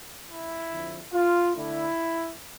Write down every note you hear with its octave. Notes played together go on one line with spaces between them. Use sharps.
E4
F2 D3 F3
F4
D3 A3 D4 E4